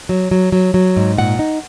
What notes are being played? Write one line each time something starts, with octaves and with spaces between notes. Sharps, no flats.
F#3
F#3
F#3
F#3
G#2
A#2 F#5
D#4